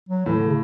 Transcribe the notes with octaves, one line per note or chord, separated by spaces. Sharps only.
F#3
A2 E3
D3
C#3